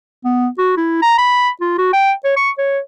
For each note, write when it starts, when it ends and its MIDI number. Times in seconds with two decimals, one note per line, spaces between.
0.24 0.48 59
0.58 0.74 66
0.77 0.99 64
1.02 1.18 82
1.18 1.49 83
1.61 1.74 65
1.78 1.93 66
1.93 2.12 79
2.24 2.34 73
2.36 2.50 85
2.58 2.79 73